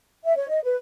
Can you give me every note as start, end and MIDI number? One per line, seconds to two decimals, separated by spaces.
0.24 0.35 76
0.36 0.48 73
0.50 0.60 75
0.64 0.76 71